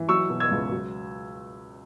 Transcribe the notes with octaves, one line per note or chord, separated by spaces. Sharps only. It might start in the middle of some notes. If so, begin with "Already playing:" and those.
Already playing: E3
F#3 C#6 E6
B2
E6 G#6
C#2
F#3